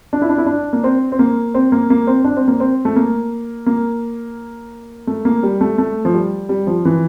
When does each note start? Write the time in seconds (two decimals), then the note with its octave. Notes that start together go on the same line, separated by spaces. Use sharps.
0.13 D4
0.22 E4
0.29 D4
0.38 E4
0.46 D4
0.73 A#3
0.84 C4
1.12 C4
1.19 A#3
1.54 C4
1.72 A#3
1.90 A#3
2.07 C4
2.24 D4
2.37 C4
2.48 A#3
2.60 C4
2.85 A3
2.96 A#3
3.66 A#3
5.07 A3
5.25 A#3
5.43 G3
5.61 A3
5.78 A3
6.05 F3
6.14 G3
6.49 G3
6.67 F3
6.85 E3